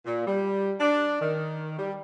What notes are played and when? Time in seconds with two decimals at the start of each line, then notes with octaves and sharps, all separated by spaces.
0.06 A#2
0.27 G3
0.80 D4
1.21 D#3
1.79 G3